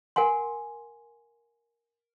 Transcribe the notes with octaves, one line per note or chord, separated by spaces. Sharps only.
A#4 F#5 G#5 C6